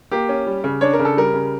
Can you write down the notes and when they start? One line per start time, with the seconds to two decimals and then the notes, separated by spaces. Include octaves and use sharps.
0.12 A#3 G4
0.29 C#4
0.47 G3
0.64 C#3
0.81 D4 C#5
0.93 A#4
0.99 C#3
1.05 A4
1.17 G3 A#4
1.34 C#3